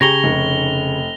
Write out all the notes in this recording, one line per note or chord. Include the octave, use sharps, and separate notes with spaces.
C#3 G4 G#4 C#5 A#5 A#6 F7 G7
F1